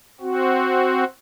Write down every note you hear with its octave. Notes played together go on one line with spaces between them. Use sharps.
C4 F#4